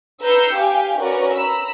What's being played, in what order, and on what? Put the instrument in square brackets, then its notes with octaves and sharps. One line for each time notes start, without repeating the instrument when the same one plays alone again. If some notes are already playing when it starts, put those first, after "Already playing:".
[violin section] B4 A#5 E6 G6 C7 C#7
G4 F5 G5 G#5
C#4 F#4 A#4 B4 D5
A#5 B5 E6